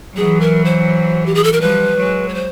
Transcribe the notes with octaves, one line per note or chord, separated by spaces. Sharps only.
E3 F#3 G#4
A#4
C5
G4
G#4
A4
A#4
F3 G3 B4
F#3 G#3
C#5
C5